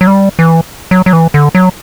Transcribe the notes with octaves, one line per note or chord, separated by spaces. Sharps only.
F#3
G3
E3
F#3
F#3
E3
D3
F#3